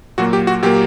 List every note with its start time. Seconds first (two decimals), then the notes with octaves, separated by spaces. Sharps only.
0.18 A#2 F#3 A#3 F#4
0.33 G4
0.47 F#4
0.62 A#2 F#3 A#3 G4